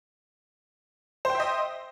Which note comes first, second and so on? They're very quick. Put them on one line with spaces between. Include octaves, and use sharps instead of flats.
C5 G5 E5 D#5